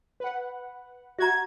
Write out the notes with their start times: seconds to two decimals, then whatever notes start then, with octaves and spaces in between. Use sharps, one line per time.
0.20 B4 F#5
1.19 F#4 E5 A#5 G#6